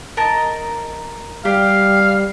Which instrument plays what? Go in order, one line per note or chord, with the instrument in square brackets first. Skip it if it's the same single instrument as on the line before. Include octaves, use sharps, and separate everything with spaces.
[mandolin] A#4 D#5 A5
[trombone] G3 [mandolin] G4 [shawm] F5